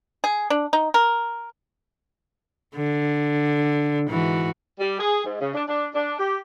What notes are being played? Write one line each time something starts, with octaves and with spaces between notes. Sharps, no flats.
G#4
D4
D#4
A#4
D3
G#2 E3 F#4
G3
G#4
G#2
C#3
D4
D4
D4
G4